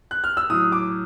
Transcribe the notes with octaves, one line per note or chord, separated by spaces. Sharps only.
F#6
F6
E6
A2 F#3 D#6
D6